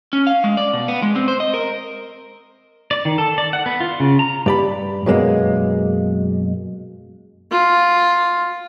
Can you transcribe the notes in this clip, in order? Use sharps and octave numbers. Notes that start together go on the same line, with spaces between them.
C#4
F5
G#3
D5
B2
B3
G#3
C4
C5
D#5
A#4
D5
D#3
A4
D5
F#5
B3
F4
C#3
A#5
G2 D5 B5
F#2 B2 G#3 A#3
F4